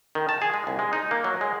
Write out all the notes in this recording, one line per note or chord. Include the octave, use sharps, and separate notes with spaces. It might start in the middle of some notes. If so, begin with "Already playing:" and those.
D#3
A5
G#4
G#3
C2
G#3
D#4
A#3
F#3
G#3